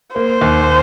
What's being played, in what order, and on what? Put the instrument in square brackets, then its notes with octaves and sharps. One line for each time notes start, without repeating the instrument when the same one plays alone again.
[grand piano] A#3 [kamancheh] C5
[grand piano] D#2